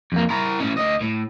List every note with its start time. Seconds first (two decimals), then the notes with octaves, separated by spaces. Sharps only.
0.12 F2 A#3
0.30 E4 A#4
0.60 A2 C#4
0.77 D2 D#5
1.01 A2